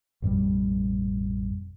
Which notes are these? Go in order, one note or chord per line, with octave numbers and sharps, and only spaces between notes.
A1 F2 B2 G3